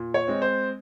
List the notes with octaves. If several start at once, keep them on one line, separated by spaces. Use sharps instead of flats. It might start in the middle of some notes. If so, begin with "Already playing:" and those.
Already playing: A#2
C#5
G#3 C4
C5